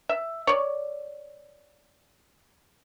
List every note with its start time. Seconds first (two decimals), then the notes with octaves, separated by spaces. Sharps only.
0.09 E5
0.47 C#5 D5